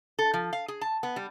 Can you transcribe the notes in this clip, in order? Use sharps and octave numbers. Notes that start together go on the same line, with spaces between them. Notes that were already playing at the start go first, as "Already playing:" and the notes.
A4
F3
F5
G#4
A5
B3
G3